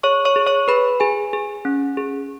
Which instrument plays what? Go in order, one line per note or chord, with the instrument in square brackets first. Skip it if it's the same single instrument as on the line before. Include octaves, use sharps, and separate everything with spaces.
[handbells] G#4 C#5 C#6
C#5 C#6
G#4
C#5 C#6
G#4 B4 B5
G#4 G#5
G#4
C#4
G#4